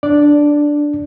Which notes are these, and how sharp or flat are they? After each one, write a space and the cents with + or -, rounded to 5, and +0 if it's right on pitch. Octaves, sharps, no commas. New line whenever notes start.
D4 +0 D5 +0